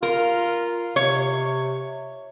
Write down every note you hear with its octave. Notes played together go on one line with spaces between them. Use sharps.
F4 A#4
C3 C#5